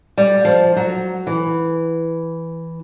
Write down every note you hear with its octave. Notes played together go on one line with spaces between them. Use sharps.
G3
F3
F#3
E3